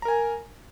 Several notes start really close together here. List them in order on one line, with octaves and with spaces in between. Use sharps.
A#5 A#4 G#5